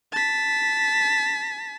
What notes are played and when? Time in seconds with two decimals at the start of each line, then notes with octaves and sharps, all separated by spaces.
0.12 A5 B6